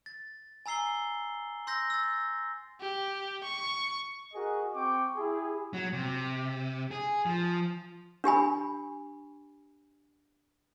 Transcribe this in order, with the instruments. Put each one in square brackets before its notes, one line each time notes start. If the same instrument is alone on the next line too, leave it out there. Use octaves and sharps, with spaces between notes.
[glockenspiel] A6
G#5 A#5 E6 C7 G7
C6 E6 G6 A#6
E6 A6
[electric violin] G4
C#6
[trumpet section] F#4 G#4 A#4 D#5
C4 G5 C#6 D6
E4 G4 G#4
[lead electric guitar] F#3
C3
G#4
F3
[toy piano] D4 G4 G#5 B5